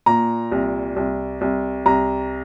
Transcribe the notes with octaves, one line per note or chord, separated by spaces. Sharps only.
A#2 A#5
C2
C2
C2
C2 A#5